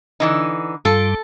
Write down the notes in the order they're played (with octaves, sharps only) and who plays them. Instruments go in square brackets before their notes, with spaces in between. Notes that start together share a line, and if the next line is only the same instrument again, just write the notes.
[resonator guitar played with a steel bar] D3 E3 D#4
[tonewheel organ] G2 G3 [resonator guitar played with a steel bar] F4 [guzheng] A4